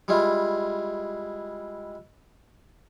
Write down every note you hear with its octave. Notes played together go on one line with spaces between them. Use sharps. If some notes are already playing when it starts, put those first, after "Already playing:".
G3 G#3 E4 F4